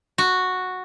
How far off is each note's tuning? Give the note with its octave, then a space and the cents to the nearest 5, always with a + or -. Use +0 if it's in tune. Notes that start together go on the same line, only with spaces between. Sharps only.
F#4 -5